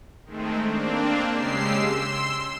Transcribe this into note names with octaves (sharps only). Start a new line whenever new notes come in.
D#3 G#3 A3 C4
A#3 C4 D4
C#3 G#3 G4 E6 C7
C6 E6